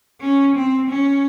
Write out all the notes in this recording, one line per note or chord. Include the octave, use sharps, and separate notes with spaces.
C#4
C4
C#4